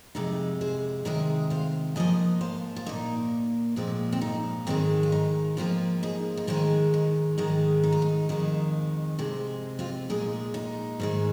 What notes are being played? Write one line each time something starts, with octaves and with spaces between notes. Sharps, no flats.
F2 C3 G#3 D#4
G#4 C5
C3 D#3 G#3 A#4 D#5
C5 F5
G#2 F3 A#3 D#5 G#5
C5 F5
F4
A#2 A#3 D#4
A#2 F3 G#3 C4
C4
D#4
G#2 D#3 G#3 C4
F4
D#4
G#2 F3 A#3 C4 F4
D#4 G#4
D#4
G#2 D#3 G#3 C4 F4
D#4
G#2 D#3 G#3 D#4
D#4
F4
D#4
F2 D#3 G#3
C3 G#3 C4
C4 F4
A#2 G#3 D#4 G#4
D#4
G#2 D#3 G#3